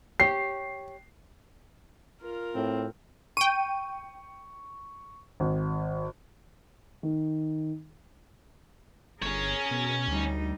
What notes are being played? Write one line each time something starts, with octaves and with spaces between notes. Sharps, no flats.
G4 C#5 C7
F4 A#4
A2 C4
G5 C#6 D#7
G#1
D#3
G1 C#4 G#4 A#4 C#5
B2
D2 G3 D#4